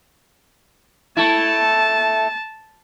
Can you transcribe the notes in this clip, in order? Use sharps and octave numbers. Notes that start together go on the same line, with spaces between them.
A3 E4 A5